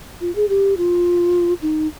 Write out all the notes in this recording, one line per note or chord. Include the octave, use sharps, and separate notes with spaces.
F4
G#4
G4
F4
D#4